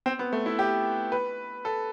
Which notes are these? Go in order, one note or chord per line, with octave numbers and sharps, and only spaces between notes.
C4
B3
A3
E4
G4
B4
A4